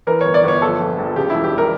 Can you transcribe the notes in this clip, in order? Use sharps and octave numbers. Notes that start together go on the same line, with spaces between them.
E3 A#4
G1 C#5
D5
G1 C#5
F3 A4
A#1
A#1
C#3 G4
E1 E4
G4
E1
A#4